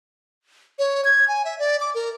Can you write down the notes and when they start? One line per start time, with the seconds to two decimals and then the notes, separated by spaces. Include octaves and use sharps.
0.79 C#5
1.05 G#6
1.28 G#5
1.45 E5
1.59 D5
1.80 D6
1.95 A#4